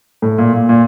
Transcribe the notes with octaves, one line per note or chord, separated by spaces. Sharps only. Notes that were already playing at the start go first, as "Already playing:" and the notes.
A2
A#2
A#2
A#2